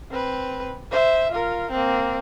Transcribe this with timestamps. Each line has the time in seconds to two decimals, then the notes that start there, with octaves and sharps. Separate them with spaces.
0.11 C4 B4
0.92 C5 E5
1.32 F4 A#4
1.71 A#3 C4